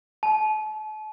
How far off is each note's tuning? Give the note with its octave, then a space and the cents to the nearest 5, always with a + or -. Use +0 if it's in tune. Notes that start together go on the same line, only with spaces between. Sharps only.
A5 -40